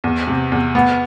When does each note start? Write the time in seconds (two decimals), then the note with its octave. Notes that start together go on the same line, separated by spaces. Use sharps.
0.04 E2
0.27 C3
0.52 E2
0.75 B3